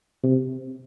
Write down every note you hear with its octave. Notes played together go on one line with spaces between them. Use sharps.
C3